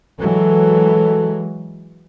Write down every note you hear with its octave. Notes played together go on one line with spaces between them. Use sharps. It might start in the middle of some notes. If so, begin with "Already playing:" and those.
E3 F#3 G#3 A4